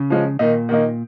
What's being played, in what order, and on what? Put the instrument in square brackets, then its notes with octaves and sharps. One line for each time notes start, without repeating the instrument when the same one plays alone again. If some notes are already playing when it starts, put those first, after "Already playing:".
Already playing: [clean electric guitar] C#3
[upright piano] F3 G#3 C#4
[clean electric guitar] A#2 [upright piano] D#3 A#3 D#4
[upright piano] D#3 A#3 D#4